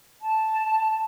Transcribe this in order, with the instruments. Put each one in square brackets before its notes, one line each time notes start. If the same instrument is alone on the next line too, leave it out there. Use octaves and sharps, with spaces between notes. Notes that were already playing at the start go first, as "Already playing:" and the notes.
[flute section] A5